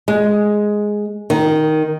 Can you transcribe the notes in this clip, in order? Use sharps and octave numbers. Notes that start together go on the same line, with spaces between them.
G#3
D#3